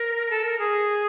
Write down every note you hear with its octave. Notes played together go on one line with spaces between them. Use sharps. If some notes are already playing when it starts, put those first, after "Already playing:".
Already playing: A#4
A4
A#4
G#4